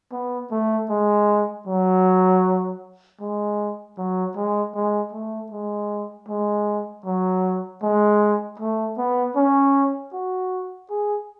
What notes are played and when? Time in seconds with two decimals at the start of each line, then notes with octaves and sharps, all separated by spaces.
0.12 B3
0.52 A3
0.90 G#3
1.67 F#3
3.21 G#3
3.98 F#3
4.36 G#3
4.75 G#3
5.13 A3
5.52 G#3
6.28 G#3
7.05 F#3
7.83 G#3
8.60 A3
8.98 B3
9.36 C#4
10.13 F#4
10.90 G#4